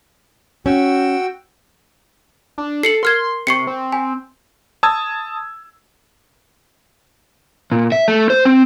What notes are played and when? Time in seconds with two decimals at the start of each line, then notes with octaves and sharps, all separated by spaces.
0.66 C#4 F#4 G5 E6
2.58 D4
2.83 A4 C7 C#7 F#7
3.03 A#4 C6 F6 G#6
3.47 C3 C#6 C7 C#7
3.67 C4
3.92 G#5
4.83 A5 D#6 E6 G#6
7.72 A#2
7.92 E5
8.08 A3
8.30 C5
8.45 C4